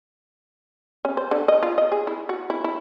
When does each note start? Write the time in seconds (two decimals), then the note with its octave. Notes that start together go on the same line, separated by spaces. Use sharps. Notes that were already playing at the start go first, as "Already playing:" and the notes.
1.05 C#4
1.17 C5
1.31 D3
1.48 D#5
1.63 F4
1.78 D#5
1.92 G#4
2.07 E4
2.29 F#4
2.50 E4
2.64 E4